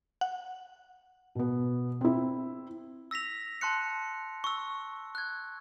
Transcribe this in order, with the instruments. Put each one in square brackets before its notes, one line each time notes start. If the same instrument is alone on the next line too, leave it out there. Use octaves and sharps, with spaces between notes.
[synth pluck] F#5
[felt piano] B2 B3
C4 E4
[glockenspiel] E6 A#6 B6 F7
A5 C6 F#6 C#7
C#6 E6
F#6 G#6